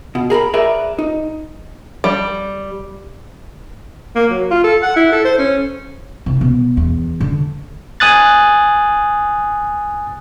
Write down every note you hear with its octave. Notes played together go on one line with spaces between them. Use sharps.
B2
G#4 A#4 A#5 B5
G#4 A#4 B4 D5 E5
D#4
G3
A#3
F#3
F4
A4
F#5
E4
A4
C5
C#4
C2
B2
E2
D3
G#5 D#6 F#6 A6